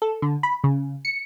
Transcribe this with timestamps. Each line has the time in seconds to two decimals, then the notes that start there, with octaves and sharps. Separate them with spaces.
0.02 A4
0.22 D3
0.43 B5
0.64 C#3
1.05 C#7